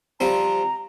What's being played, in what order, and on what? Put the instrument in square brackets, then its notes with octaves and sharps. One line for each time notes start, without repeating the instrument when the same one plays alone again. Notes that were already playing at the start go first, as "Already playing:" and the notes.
[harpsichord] F3 G3 C4 [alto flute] A#5